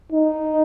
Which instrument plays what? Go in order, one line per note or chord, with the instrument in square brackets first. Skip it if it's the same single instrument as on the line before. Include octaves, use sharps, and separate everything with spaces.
[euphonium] D#4